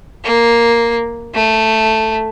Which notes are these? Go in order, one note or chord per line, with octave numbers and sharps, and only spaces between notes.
A#3
A3